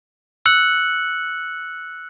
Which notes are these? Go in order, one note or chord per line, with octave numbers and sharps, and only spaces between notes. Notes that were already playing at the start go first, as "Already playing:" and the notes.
E6 F#6 C#7 F#7